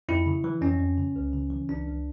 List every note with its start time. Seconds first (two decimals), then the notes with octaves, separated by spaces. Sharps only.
0.09 F2 E4
0.26 C#3
0.44 E3
0.61 F2 C#4
0.80 F2
0.98 C#3
1.16 C#2
1.33 C#3
1.51 E3
1.69 C#2 D4
1.87 C#2